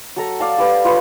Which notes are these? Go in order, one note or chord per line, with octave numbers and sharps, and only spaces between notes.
F#3 A4 A#5
D5 F5 A5
G4 B4 D5
F4 B4 C#5